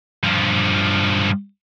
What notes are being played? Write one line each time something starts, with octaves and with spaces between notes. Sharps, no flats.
G2 F3